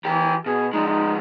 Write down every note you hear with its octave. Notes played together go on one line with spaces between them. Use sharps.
E3 G4 A#4
B2 G#4
F3 G#3 D#4
D#4